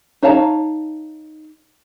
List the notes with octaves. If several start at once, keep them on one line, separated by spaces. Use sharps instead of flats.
D#4 C#5 F5 A5 A#5